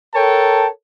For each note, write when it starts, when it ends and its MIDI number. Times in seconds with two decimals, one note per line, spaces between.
0.15 0.67 69
0.15 0.67 70
0.15 0.67 73
0.15 0.67 79
0.15 0.67 81